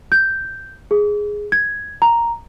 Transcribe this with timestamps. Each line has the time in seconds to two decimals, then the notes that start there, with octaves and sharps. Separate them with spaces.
0.12 G6
0.91 G#4
1.52 G#6
2.02 A#5